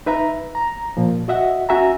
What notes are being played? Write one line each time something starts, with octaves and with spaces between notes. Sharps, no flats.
D#4 B4 E5 A#5
A#5
A#2 F3
F#4 D#5 E5 F#5
C#4 F#4 E5 G#5 A#5